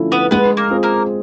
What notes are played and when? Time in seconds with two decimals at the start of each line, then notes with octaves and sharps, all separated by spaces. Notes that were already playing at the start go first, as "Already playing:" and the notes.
Already playing: D3 F3 A3 C#4 E4
0.12 B3 B4
0.31 G#3 B3 B4
0.57 A#3 A#4
0.70 C4 F4 G#4
0.83 A#3 A#4